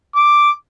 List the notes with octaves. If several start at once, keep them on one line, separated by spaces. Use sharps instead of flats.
D6